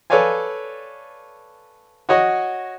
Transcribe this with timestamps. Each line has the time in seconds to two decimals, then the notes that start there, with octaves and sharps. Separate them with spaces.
0.10 A4 B4 C#5 D5 F5 G#5
2.09 F#4 C#5 D#5 F#5